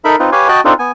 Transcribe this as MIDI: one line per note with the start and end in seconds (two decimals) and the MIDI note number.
0.05 0.16 63
0.05 0.16 69
0.05 0.16 70
0.05 0.16 76
0.05 0.16 83
0.19 0.30 60
0.19 0.30 63
0.19 0.30 65
0.19 0.30 71
0.32 0.48 67
0.32 0.48 71
0.32 0.48 73
0.32 0.48 77
0.32 0.48 80
0.48 0.61 66
0.48 0.61 75
0.48 0.61 79
0.48 0.61 81
0.48 0.61 90
0.65 0.73 60
0.65 0.73 62
0.65 0.73 63
0.65 0.73 65
0.65 0.73 69
0.79 0.92 59
0.79 0.92 80